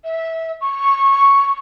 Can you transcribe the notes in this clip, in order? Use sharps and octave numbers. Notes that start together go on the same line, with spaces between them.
E5
C#6